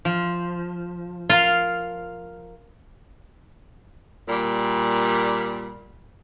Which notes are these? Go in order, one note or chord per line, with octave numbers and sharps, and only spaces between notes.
F3
F4 A#4 F5
A#2 G3